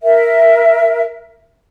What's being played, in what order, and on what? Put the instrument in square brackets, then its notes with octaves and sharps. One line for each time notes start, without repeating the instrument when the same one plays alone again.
[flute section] A#4 E5